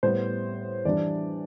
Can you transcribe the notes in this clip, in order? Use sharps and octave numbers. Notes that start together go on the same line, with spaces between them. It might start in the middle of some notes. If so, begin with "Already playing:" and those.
A2 G3 B3 C5
E3 G3 D4 D5